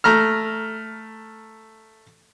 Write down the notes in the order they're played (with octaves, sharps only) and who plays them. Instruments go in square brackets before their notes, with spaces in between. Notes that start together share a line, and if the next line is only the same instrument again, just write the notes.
[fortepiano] A3 A#5 F6